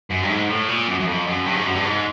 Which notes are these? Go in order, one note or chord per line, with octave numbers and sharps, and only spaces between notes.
F#2
G2
G#2
A2
A#2
F#2
F#2
F2
F#2
G2
G#2
F#2
G2
G#2